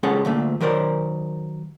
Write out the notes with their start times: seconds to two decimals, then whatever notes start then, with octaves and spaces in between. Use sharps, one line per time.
0.03 C#2 G#3 C#4 G#4 A4 F#5
0.25 D2 A#2 A3
0.61 D#3 F#3 A#4 C5 D5